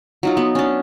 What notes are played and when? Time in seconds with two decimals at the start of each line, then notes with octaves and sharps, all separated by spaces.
0.23 F#3 D#4 F4
0.37 B3 F#4
0.55 C#4 D4